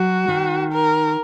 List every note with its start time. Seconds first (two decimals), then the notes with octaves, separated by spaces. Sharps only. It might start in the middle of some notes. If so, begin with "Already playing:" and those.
Already playing: F#3 F#4
0.28 D#3
0.72 A#4